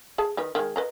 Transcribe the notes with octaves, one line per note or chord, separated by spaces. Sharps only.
G#4 A5
D#3 D#4 B4
D#3 G#3
B4 D#5 A#5